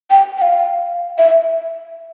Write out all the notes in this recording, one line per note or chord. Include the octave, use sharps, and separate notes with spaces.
G5
G5
F5
E5